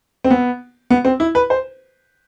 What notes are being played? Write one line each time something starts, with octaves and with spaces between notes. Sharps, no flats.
C4
B3
B3
C4
E4
B4
C5